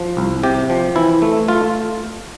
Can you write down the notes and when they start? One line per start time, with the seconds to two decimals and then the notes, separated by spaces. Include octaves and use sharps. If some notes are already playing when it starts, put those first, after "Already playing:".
Already playing: F3
0.17 C2
0.43 C3 G4
0.70 F3
0.96 E3 E4
1.22 A3
1.48 A3 F4